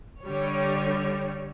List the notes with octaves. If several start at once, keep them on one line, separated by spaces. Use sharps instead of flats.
D3 G3 C#5